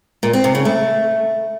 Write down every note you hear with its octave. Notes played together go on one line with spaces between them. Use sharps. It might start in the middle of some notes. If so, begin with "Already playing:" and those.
A#2
C4
C3
C#3
A3